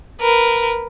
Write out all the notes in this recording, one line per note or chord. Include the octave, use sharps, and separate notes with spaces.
A#4 B4